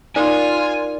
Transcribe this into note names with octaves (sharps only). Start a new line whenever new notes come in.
D#4 F4 A#4 D5 G#5